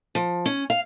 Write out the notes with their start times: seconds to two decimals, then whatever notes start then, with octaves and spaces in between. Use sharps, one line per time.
0.15 F3
0.46 C#4
0.70 F5